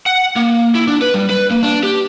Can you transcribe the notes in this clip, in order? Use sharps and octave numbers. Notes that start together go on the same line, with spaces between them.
F#5
A#3
E4
D4
B4
G3
B4
A#3
D4
G4